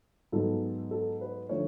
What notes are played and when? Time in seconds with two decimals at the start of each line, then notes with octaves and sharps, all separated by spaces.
0.32 G#2 F#3 B3 A4
0.91 A4
1.21 B4
1.49 D3 F3 A3 F4 C#5